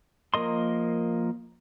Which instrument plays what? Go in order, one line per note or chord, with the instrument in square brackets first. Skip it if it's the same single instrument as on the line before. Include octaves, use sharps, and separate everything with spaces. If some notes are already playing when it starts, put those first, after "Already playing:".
[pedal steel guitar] F3 A#3 A#4 D#5 C6